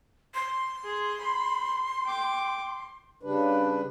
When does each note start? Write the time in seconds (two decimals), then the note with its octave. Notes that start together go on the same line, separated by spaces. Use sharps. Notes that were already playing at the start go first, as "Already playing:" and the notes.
0.34 C6
0.84 G#4
1.20 B5
2.05 G5 D6
3.23 C#3 G3 D4 B4